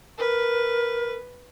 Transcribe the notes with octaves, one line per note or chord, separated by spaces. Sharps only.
A#4 B4